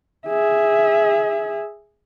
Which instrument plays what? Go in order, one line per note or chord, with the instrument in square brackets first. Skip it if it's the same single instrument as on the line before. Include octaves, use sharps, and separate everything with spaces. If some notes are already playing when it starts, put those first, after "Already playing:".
[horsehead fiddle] G#4 E5